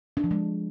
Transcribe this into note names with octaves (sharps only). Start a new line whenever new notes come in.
D4
F3
G#3